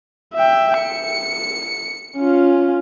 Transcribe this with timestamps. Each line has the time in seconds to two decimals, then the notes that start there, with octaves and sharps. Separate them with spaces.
0.34 E5 G5
0.78 C#7
2.17 C#4 F4